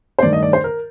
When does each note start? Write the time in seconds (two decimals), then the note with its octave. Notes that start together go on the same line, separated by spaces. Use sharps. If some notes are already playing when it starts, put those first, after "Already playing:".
0.19 C5
0.22 G2 D#3 A3 D5
0.33 D#5
0.43 D5
0.53 C5
0.64 A#4